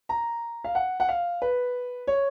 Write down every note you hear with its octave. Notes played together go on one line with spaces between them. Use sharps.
A#5
F5
F#5
F#5
F5
B4
C#5